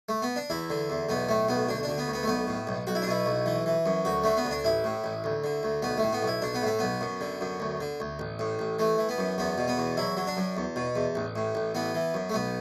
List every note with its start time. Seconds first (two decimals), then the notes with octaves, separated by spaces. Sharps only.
0.09 A3
0.22 B3
0.36 D4
0.50 E2 E4
0.70 D3
0.90 E2
1.09 B1 B3
1.29 A2 A3
1.48 B1 B3
1.69 D2 D4
1.83 D4
1.88 D3
1.98 B3
2.08 D2
2.13 B3
2.23 A3
2.28 B1 B3
2.47 A2
2.67 B1
2.87 B1 F#4
2.95 E4
3.02 D4
3.07 B2 E4
3.26 B1
3.46 E3
3.66 E3
3.86 F#2
4.05 D2 F#4
4.24 D3 A3
4.37 B3
4.45 D2
4.51 D4
4.64 A1 E4
4.84 A2
5.04 A1
5.24 D2
5.44 D3
5.63 D2
5.82 B1 B3
5.98 A2 A3
6.13 B3
6.23 B1 E4
6.42 B1 D4
6.54 B3
6.62 A2 A3
6.79 B1 B3
7.01 F#2
7.21 D3
7.41 F#2
7.60 D2
7.81 D3
8.00 D2
8.19 A1
8.39 A2
8.59 A1
8.79 E3 A3
8.98 E3
9.09 B3
9.18 F#2
9.38 E2 B3
9.58 B2
9.68 B3
9.78 E2
9.97 F#3 E4
10.17 F#3
10.27 D4
10.37 F#2
10.57 E2
10.76 B2
10.96 E2
11.15 A1
11.36 A2
11.55 A1
11.75 E3 B3
11.95 E3
12.14 F#2
12.30 A3
12.34 B1 B3